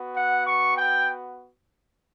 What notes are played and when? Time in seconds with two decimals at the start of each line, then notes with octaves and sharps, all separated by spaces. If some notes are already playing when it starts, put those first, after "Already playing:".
Already playing: B3 F#4
0.15 F#5
0.46 C#6
0.77 G5